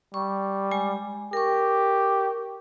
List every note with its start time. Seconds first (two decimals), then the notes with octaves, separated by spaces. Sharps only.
0.14 G3 C#6
0.72 G#3 G#5
1.33 G4 A#4 C#6